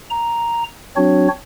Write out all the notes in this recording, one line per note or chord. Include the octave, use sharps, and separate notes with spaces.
A#5
F#3 C4 D4 F#4 C#5